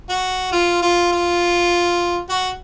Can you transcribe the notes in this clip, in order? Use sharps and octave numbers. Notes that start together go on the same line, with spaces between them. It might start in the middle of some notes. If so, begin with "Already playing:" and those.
F#4
F4
F4
F4
F#4